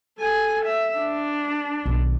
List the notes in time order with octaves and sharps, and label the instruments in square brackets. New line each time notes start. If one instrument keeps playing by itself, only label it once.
[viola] A4 G#5
E5
D4
[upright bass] B1 D#3